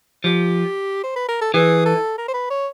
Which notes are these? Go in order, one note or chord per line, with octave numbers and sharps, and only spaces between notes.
F3 G4
C5
B4
A#4
A4
E3 G#4
A4
A#4
C5
B4
C#5